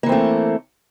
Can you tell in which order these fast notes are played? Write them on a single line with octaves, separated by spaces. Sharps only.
A#3 E3 C4 A3